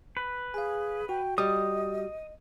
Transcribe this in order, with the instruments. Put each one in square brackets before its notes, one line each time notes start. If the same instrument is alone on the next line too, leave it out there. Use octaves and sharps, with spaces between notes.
[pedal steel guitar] B4
[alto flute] G#4 [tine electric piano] F5 G#5
[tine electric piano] F#4 [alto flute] G5
[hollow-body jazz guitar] G3 [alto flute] D#5 [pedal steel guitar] D#6